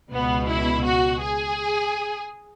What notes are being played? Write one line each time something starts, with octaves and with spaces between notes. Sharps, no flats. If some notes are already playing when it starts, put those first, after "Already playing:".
C#2 B2 B3
E4
F#4
G#4